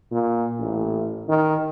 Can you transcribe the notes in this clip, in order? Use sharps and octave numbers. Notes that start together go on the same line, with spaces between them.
A#2
A1
D#3